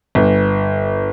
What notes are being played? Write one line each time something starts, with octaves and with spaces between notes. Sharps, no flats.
G1